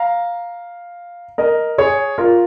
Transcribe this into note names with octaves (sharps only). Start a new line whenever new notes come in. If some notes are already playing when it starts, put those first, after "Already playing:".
Already playing: F5 A#5
A#4 D#5
G#4 C#5
F4 A#4